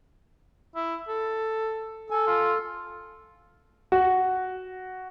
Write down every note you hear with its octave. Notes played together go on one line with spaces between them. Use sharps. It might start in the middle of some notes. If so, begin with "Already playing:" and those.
E4
A4
A4 G#5
F4
F#4